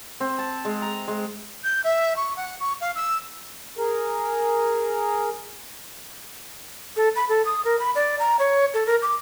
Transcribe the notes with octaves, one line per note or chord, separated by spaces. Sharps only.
C4
A5
G#3
A#5
G#3
G6
E5
C#6
F#5
C#6
F5
E6
G#4 A#4
A4
B5
A4
D#6
A#4
B5
D5
A#5
C#5
A4
A#4
D6